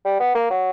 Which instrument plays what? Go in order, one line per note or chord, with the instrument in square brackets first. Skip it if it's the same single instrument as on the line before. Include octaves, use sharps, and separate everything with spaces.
[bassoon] G3
B3
A#3
F#3